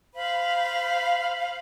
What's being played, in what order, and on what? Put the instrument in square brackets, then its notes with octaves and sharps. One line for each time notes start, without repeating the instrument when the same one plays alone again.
[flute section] C5 F5 B5